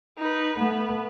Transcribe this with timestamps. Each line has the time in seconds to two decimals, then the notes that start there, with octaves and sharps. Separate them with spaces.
0.18 D#4 B4
0.58 A3 B3 B4